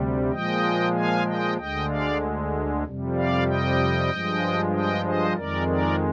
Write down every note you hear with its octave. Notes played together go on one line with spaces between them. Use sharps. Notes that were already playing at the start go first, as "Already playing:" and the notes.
Already playing: D2 C3 G3
A#2 F3 G#3 D#5 G5
F5 G#5
D#5 G5
D2 D3 G#3 D#5 G5
D5 F5
F2 C3 G3
D5 F5
D#5 G5
G2 F3 G#3
D#5 G5
C5 D#5
F2 D#3 G#3 A#4 D5
A#4 D5